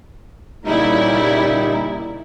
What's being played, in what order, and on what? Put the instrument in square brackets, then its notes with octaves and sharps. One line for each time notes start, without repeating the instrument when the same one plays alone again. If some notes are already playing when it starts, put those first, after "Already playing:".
[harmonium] A#2 D#4 [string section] C#3 G3 E4